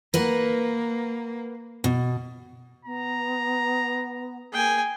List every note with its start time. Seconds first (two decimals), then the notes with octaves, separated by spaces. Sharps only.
0.14 A#3 A#4 B4 F#5
1.84 B2
2.85 B3 A#5
4.53 A#3 G#4 G5 G#5